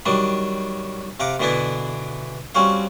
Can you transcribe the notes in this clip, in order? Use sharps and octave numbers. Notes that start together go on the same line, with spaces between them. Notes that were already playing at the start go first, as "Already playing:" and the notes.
D#3 F#3 G3 D4
C3 F5 F#5 A#5 D6
B2 D3 E3 B3 D4 E4
G3 C4 C#4 F#4 F5